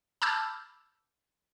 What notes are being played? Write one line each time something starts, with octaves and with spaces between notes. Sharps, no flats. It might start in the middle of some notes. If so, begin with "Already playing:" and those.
A5 B5 D6 E6 F6 G6